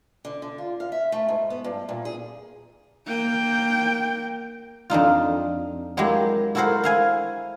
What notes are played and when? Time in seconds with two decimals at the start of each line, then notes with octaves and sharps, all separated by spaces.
0.25 D3
0.42 D3
0.58 F4
0.80 F5
0.92 E5
1.12 A3
1.29 G#2
1.50 B3
1.64 G2
1.89 A#2
2.05 G#4
3.06 A#3 G5
4.90 F2 D4 D#4 F4
5.97 F#3 G#3 A#3 E4 G4
6.55 E4 F#4 A4 A#4 C5 F#5
6.84 E4 F5 G#5